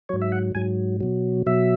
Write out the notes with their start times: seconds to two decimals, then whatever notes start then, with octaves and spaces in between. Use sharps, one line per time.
0.09 G#2 F#3 C#5
0.22 E5
0.32 F#5
0.55 G#2 F#3 G#5
1.00 B2 F#3
1.46 B2 F#3 E5